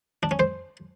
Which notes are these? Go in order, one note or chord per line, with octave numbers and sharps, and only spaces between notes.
D4
C#4
C5